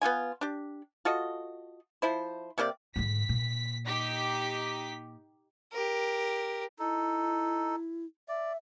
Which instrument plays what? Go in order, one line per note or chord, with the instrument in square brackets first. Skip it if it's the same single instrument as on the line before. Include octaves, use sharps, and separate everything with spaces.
[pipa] B3 D#4 F4 G#5
D4 G4
F4 F#4 A4 D#5
F3 E4 C5
C3 A#3 G4 D5
[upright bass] G#2 D3 [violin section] B6
[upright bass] A#2
[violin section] D#4 G4 B6
[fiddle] G4 A#4
[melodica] D#4 A4 [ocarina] E4
[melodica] D5 [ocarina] E5